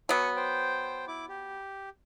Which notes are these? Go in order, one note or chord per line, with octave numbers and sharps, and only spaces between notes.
F#3 B3 G#5 C#6
C5 G5
E4 D6
G4